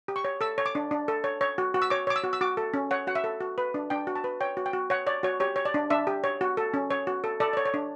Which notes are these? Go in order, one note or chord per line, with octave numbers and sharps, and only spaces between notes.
G4
C#6
C#5
A4 E6
C#5
D6
D4
D4
A4
C#5
C#5
F#4
F#4
E6
C#5 D6
C#5 D6
E6
F#4
E6
F#4 D6
A4
C#4
C#5 F#5
F#4 F#5
E5
A4
F#4
B4
D4
D4 G5
F#4
A5
B4
C#5 G5
F#4
G5
F#4
C#5 F#5
C#5 D5
F#4 C#5
G4 C#5
C#5
D5
D4
D4 E5
G4
C#5
F#4
A4
C#4
C#5
F#4
A4
A4 D5
C#5 D5
C#5
D4